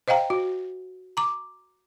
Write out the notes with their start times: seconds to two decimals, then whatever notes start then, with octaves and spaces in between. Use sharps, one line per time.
0.08 C5 D#5 F5 G5 A#5
0.30 F#4
1.17 A#5 D6